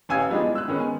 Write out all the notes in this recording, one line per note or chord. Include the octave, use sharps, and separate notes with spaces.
A1 F5 G#5 E6 G#6
F3 G3 G#3 B3 D4 D#4
E3
E6 F#6
D#3 G#3 B3 C#4
G#5